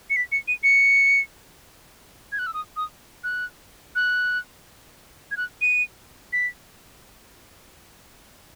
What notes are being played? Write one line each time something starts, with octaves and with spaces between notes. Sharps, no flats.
C#7
B6
C#7
D#7
C#7
G#6
F#6
E6
D#6
D#6
F#6
F#6
G#6
F#6
D#7
B6